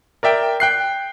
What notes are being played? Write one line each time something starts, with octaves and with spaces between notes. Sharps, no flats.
A#4 D5 E5 G5
G5 F#6 C7